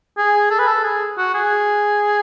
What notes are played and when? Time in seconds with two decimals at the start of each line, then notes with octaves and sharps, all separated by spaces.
0.18 G#4
0.51 A4
0.59 B4
0.67 A4
0.84 G#4
1.18 F#4
1.35 G#4